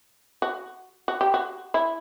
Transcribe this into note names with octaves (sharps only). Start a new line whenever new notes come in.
F#4
F#4
G4
F#4
E4